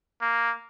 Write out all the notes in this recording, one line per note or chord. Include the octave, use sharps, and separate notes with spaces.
A#3